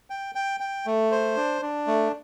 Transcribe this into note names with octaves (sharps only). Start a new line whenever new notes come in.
G5
G5
G5
A3
C5
D4
D4
A3